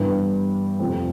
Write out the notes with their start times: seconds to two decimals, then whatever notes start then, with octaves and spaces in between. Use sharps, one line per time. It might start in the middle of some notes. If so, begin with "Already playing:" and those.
Already playing: G2 E3 G3 B3
0.79 F2 C3 F3 A3 C4